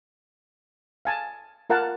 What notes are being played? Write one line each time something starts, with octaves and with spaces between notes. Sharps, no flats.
F5 G#5 A5
F4 A#4 F5 F#5 A5